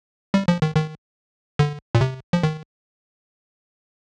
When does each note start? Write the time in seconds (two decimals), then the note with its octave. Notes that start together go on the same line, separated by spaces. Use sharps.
0.34 G3
0.48 F3
0.62 D#3
0.75 D#3
1.59 D3
1.95 A#2
2.01 C3
2.33 F3
2.43 D#3